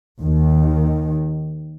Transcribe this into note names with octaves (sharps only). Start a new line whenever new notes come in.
D#2 D#3